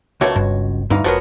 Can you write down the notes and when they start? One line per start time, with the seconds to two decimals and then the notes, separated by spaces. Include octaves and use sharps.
0.21 C#2 B2 A3 A#3 F#4 C#5
0.36 G1 G2 B2
0.90 D2 G2 E3 D#4 F5
1.04 F1 F3 F#3 B3 F#4 G#4 A#4